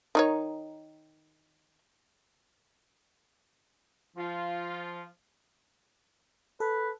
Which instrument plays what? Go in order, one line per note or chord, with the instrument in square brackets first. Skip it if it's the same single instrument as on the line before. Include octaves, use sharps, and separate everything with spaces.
[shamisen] D#3 D#4 C#5
[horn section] F3 F4
[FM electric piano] A4 [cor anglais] B4